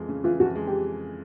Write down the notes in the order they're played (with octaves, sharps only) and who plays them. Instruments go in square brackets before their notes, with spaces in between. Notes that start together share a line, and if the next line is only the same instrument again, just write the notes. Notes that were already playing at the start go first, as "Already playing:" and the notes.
Already playing: [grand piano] F2 E3 G#3
C#3
[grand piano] E3 [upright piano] F4
[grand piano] F2 [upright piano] F#4
[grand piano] G#3
[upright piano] G4